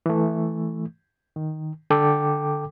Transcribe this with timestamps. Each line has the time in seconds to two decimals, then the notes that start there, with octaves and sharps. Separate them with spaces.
0.06 E3 A3
1.36 D#3
1.90 D3 A4 G5 D6